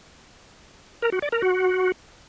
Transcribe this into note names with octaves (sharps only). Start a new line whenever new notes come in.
A#4
F#4
D5
A#4
F#4